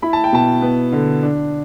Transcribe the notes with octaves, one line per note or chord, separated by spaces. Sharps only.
E4 B5
A5
G5
B2 A5
B3
D3
D4